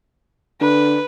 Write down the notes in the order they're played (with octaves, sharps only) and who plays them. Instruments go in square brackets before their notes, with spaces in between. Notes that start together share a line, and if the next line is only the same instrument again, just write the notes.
[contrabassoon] D3 [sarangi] B4